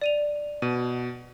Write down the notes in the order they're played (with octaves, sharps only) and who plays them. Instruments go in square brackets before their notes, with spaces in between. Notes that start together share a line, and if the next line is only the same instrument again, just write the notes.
[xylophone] D5 D#7 F7
[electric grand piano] B2 [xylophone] D#7